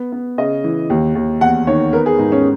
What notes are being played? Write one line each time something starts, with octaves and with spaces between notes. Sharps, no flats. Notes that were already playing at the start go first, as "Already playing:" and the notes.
Already playing: B3
B3
C#3 D#5
E3
D#2
D#2
E2 F#5
D#3 C#5
B3 A#4
G#4
G#2 D#4
C#4